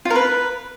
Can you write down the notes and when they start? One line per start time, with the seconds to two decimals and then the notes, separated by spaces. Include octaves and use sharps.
0.05 F4
0.10 A#4
0.15 B4